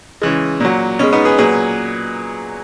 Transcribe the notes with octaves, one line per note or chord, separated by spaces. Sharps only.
C#3 E3 G#3
A#2 F#3
B2 G#3 C#4
B3 D#4
G#4 B4
A#2 F#3 G#4 B4